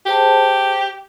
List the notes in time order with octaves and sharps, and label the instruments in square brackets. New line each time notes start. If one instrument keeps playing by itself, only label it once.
[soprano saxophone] G4 [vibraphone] G#4 C5 A5